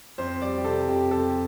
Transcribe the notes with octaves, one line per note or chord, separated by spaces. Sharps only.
F2 C5
G3 D5
G4
C3 A4
F2 G4
F2 A4